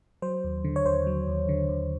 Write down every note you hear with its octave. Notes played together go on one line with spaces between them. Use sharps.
F#3 C5
D#2
D3
C#5
D#2 C5
F#3
D#2
D3
D#2